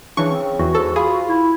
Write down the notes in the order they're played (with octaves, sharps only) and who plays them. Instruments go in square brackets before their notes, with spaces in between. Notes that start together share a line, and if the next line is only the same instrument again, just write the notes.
[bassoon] C#3 [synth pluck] E3 C#6 [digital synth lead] D4
[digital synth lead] C4
[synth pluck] E2 [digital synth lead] F#4
[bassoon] G#2 [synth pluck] A4
[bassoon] F4 [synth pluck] G#4 [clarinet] B5
[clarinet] E4